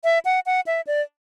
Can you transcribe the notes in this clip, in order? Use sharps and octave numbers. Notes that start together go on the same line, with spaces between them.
E5
F#5
F#5
E5
D5